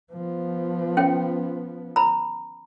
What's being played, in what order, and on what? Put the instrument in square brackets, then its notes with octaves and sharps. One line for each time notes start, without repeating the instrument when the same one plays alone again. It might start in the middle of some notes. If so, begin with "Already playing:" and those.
[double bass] F3 B3
[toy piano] C#4 G5
A#5 B5